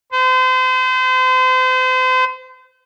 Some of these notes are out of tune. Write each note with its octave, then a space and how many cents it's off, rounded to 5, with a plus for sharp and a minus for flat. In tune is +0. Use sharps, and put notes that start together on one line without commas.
C5 -35